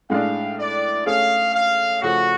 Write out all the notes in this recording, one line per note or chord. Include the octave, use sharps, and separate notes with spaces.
A2 G#3 D4 F5
D5
A3 C#4 G#4 C#5 F5
F5
C#3 F3 A3 F#4